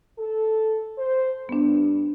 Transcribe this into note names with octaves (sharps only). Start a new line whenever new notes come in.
A4
C5
G2 B3 D4